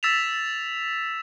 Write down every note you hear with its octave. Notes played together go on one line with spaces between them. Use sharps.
E6 A6 B6 E7 F7